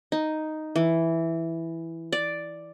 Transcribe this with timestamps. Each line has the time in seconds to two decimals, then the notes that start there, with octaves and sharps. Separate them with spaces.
0.12 D#4
0.76 E3
2.13 D5